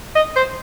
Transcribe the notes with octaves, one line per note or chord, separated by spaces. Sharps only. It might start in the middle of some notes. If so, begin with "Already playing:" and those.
D#5
C5